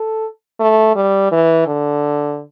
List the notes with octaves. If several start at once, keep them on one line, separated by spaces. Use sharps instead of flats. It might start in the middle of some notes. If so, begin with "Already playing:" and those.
Already playing: A4
A3
G3
E3
D3